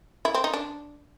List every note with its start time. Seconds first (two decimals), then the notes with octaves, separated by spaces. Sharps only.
0.25 E4
0.34 C4
0.44 D#4
0.54 D4